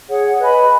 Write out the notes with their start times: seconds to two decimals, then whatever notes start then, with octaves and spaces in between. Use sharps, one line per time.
0.07 G#4 C#5 F#5
0.40 B4 D#5 G#5 B5